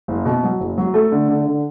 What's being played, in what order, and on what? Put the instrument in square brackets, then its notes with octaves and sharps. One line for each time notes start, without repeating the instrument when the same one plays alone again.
[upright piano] F#1
B2
F#3
F#1
F#3
A3
D3
D3
D3